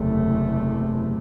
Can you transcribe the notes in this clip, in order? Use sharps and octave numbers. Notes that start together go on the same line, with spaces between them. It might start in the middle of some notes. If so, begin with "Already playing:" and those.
Already playing: F#1 E2 C3 A3